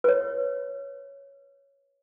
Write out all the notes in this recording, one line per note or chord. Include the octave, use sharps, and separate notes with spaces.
B4 C#5